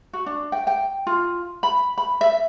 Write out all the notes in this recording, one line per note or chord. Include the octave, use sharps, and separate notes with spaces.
F#4
D4
G5
G5
F4
B5
B5
E5